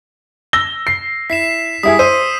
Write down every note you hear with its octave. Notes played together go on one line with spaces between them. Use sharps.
E6 A#6 G7
C7
E4 B6 C7 E7
G3 E4 G#4 D#6 B6
C5 D#6 E6 D#7